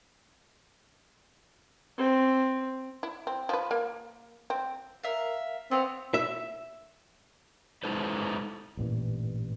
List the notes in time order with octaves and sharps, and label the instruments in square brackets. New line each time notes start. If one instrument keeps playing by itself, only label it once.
[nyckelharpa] C4
[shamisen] E4
C4
F3 B4
A#3
C4
[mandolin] A#4 E5 F5
[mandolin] B3 F5 F#5 [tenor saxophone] C4
[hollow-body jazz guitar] E5
[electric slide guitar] G#3 D#4 E4 A4 B4 C5
[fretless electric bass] A1 G2 A#2 E3